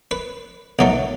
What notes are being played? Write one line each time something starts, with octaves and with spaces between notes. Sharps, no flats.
B4
B1 B2 F#3 A3